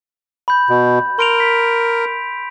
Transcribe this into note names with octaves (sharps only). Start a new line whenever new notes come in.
B5 G6
B2
A#4 C6 D7 F7
B6